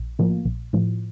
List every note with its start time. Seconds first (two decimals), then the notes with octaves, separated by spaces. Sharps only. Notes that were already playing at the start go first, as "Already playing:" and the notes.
Already playing: A#1
0.19 A2 F3 A#3
0.45 A#1
0.73 A2 F3